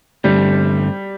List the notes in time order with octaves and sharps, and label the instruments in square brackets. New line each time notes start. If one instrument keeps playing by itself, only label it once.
[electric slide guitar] G2 D3 A3 C4 [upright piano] G3